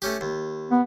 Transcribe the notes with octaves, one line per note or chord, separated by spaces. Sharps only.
A3 C#4 G4
D#2
B3